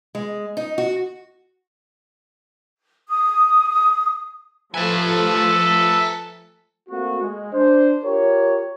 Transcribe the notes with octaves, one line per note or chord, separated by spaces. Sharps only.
G#3
D#4
F#4
D#6
F3 A3 A4 B4 E5 G#5
A3 A#3 C4 F#4
G#3
D4 C5
F4 G4 A#4 C#5